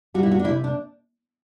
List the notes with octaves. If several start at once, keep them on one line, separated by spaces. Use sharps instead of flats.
G3 F#4
E4
F#4
D4
C3 E4
D4